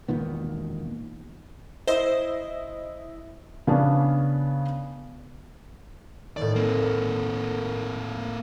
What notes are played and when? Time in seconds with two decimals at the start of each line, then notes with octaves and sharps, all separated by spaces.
0.08 E1 A#2 D#3 B3
1.87 E4 C5 D#5
3.67 C#3 B3 C#4 D4
6.37 D#2 A2 D5
6.56 A#3 C4